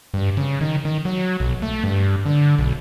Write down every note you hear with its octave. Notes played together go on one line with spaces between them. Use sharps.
G2
C#3
D#3
D#3
F#3
B1
A3
G2
D3
B1